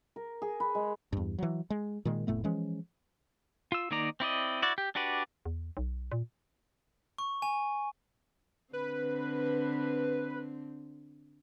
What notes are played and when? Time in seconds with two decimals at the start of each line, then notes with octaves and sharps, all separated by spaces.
0.16 A#4
0.42 G#4
0.60 B4
0.75 G#3
1.13 E2 G2
1.39 E3 F#3
1.70 G#3
2.05 A#2 D#3 G#3
2.27 F1 A2 A3 B3
2.44 E3 F3 G#3 C#4
3.72 F4 E6
3.91 D#3 A#3 D#4 D5 A#5
4.20 C4 E4 D5 D#5
4.62 E4 F#4 D5
4.78 G4
4.95 D4 F#4 G4 B4 D5
5.45 E2
5.77 B1
6.12 A#2
7.18 C#6
7.42 G#5
8.73 D3 C4 B4